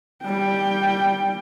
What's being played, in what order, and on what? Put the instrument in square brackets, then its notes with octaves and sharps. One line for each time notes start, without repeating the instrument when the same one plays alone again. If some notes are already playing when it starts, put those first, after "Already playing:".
[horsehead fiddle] G3 G5